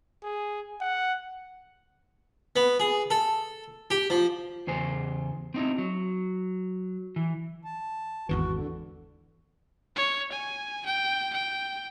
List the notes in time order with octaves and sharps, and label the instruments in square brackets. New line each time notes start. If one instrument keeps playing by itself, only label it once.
[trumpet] G#4
F#5
[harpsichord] B3
G#4
A4
G4
F3
[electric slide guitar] E2 C#3 C5 G#5
C4 D#4 E4
F#3
E3
[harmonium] A5
[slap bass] G#1 E2 E3 [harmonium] F#4
[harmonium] D3
[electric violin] C#5
G#5
G5
G5